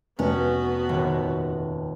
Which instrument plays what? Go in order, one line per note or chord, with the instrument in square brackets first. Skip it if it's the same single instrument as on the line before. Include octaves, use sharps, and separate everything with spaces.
[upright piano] F1 [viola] B3 F#4 [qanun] C#4
[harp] D#1